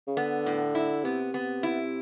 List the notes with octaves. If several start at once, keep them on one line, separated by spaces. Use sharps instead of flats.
C#3
D3 B3
A2
E4
C3 B3
B3
E4